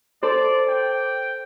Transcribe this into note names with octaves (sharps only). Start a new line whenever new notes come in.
A4 C5 D5
G5